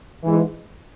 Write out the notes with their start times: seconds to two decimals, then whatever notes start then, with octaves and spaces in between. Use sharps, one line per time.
0.23 G#2 E3